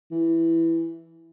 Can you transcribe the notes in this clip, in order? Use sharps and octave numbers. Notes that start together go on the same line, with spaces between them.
E3